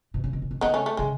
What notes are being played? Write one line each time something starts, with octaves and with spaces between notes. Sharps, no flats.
B2
C#3
B2
C#3
B2
C#3 B3 D#4
A3 C#4
A3
C#3 G#3